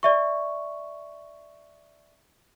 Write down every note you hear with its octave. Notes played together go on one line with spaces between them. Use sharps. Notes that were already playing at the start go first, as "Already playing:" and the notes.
D5 E5 C#6